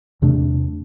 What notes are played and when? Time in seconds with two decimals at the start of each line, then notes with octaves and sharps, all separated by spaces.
0.22 E2 C3 A3 D4